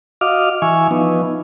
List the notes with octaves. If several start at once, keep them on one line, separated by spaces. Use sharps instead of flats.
F#4 D#5 F5 D6 F6
E3 E5 G#5 C#6
F3 B3 D#4